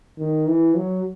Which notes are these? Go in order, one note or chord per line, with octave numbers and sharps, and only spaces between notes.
D#3
E3
F#3